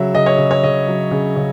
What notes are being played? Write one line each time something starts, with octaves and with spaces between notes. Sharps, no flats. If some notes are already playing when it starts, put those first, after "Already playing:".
Already playing: C#3 F#3 E5
C#3 D#5
C#5
C#3
C#5
C#3 D#5
F#3
C#3
C#3